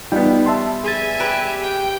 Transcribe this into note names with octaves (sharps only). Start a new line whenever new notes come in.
G3 B3 D#4 F4 G5
E5 A5 C6
G#4 E5 G#5 A6
G4 B4
G5